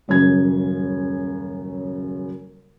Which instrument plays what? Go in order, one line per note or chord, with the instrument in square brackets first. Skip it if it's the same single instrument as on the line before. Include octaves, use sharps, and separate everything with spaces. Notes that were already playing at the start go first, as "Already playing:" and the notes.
[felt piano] D#1 F#2 C#3 G#6